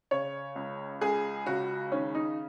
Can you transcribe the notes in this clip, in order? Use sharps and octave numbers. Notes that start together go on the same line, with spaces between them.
C#3 C#5
C#2
C#2 G#4
C#3 F#4
D#3 C#4
D#4